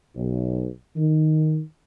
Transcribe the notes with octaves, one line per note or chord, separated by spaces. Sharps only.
B1
D#3